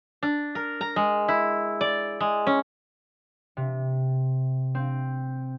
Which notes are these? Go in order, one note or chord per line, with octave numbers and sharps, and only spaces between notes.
D4
A#4
A#5
G#3
E4
D5
G#3
C#4
C3
C4